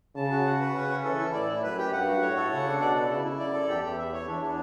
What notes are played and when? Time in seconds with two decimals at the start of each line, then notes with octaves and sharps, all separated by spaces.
0.16 C#3 A5
0.31 F#4
0.46 F#5
0.60 B4
0.75 C#3 C#4
0.89 C#4
1.04 E3 A4
1.19 E4
1.34 A2 D5
1.48 E4
1.63 F#2 B4
1.77 G4
1.93 G2 F#5
2.07 F#4
2.22 A2 C#5
2.37 A4
2.51 C#3 F#5
2.66 D4
2.80 B2 D5
2.95 A4
3.10 C#3 E4
3.25 E4
3.39 F#2 D5
3.54 A4
3.69 E2 G4
3.83 G4
3.98 E5
4.13 C#5
4.27 E2 D4
4.42 D4